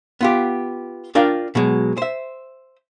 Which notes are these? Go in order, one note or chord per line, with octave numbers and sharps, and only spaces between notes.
B3 F4 G4
D4 F4 A#4 D5 F5 G5
B2 F#3 G#3
C5 E5